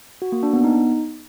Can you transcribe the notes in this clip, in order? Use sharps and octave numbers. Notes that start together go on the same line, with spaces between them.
F#4
A#3
D4
B3
D#4